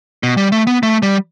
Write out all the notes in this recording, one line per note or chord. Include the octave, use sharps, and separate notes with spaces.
B2
G3
A3
B3
A3
G3